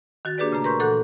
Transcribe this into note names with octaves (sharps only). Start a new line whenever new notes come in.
D#3 F#4 A6
A#3 D4 G4 G#4 B4 D5
A#2 C#3 A3 A#5
A#4 B4 A#5 C6 C#6 G6
A#2 E3 A4 F#5 F#6 G6